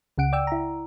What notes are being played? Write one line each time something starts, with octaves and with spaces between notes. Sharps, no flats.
C#2 C#3 F#5 D7
D5 G5 E6
E4 A#5